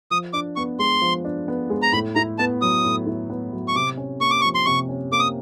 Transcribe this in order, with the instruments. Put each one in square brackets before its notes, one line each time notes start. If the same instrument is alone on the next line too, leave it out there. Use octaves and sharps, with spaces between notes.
[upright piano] F3 [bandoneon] D#6
[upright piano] D4 [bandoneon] D6
[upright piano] B3 [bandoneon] C#6
[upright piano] G#3 [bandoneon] C6
[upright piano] F3
D4
B3
G#3
[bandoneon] A#5
[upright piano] A2 [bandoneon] B5
[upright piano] E4 [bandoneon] A#5
[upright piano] B3 [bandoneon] A5
[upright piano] F#3 [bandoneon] D#6
[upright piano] A2
E4
B3
F#3
[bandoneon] C#6
[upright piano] C3 [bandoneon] D6
[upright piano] C#4
[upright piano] A#3 [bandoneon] C#6
[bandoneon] D6
C#6
[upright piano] F3
[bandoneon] C6
[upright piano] C3 [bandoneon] C#6
[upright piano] C#4
[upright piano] A#3 [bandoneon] D6
[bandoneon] D#6